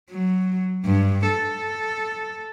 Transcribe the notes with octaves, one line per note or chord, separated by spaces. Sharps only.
F#3
G2
A4